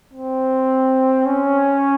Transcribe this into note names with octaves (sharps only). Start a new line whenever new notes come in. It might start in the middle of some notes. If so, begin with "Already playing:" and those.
C4
C#4